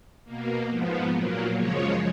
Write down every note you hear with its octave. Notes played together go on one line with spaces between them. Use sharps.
B2 A#3
G#2 F3 B3
A#2 F#3 A#3
F#2 C#3 F3 G#3 C#5